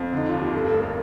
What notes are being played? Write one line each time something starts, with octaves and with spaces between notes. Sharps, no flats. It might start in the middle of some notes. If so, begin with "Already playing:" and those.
Already playing: F2
D3 D#4
D#2 F4
G4
G2 A4
A4
A1
A#4